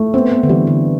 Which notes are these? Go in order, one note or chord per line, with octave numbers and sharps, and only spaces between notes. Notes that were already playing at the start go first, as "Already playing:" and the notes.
Already playing: A3
B3 C4
B3
D3
E3 G3
D3